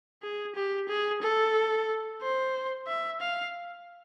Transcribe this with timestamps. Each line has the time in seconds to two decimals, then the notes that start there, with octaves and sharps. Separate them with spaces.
0.23 G#4
0.55 G4
0.88 G#4
1.21 A4
2.21 C5
2.87 E5
3.21 F5